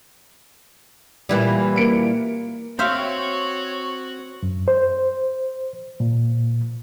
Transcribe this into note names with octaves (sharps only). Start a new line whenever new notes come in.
A#2 E3 G3
A#3 C#7 D7
C4 F#4 C5 C#5 E5 F5
F#2
C5
A#2